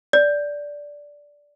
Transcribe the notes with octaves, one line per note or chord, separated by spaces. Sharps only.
D5